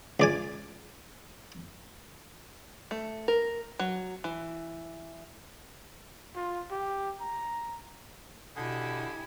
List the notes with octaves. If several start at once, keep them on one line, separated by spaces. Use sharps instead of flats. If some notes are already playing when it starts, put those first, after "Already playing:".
C#2 D5 G#5
A3
A#4
F#3
E3
F4
G4
A#5
B2 D3 E4 G4 G#5 D#6